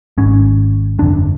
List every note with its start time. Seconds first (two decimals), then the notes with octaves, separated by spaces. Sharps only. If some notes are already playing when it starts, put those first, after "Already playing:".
0.18 G#1 G#2 C#4
0.99 G1 F2 C3 D4